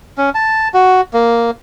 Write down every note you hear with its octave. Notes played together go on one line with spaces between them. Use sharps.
C#4
A5
F#4
A#3